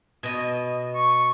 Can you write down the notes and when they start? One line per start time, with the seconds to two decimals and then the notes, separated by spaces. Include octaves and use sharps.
0.23 B2 D#5
0.95 C#6